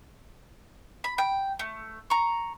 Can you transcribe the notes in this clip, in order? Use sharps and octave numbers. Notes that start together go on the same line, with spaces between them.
B5
G5
A3
A#5 C#6